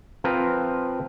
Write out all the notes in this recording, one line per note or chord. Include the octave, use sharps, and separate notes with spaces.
F3 C4 A#4 B4